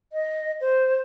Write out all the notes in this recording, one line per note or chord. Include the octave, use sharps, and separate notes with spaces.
D#5
C5